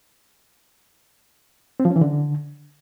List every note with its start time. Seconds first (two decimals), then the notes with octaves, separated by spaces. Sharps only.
1.80 C4
1.85 F3
1.90 C#4
1.96 E3
2.01 D3